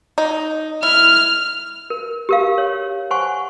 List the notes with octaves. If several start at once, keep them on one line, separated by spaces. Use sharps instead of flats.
D#4
E4 F6
A#4
G4 A#4 F5
C#5
C5 F#5 G#5 C#6